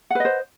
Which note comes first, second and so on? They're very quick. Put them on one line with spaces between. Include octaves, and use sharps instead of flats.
F#5 B4 D#5 C5